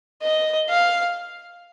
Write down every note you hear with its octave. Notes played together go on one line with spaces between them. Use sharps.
D#5
F5